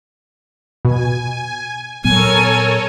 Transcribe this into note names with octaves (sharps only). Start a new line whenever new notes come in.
B2 G#5
A#2 F#3 B3 A4 A#4 C#5 G#5